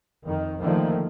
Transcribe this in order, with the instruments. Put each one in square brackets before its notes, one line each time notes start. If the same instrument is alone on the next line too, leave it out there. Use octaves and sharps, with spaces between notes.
[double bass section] F2 D#3
D3 D#3 F3 A3 A#3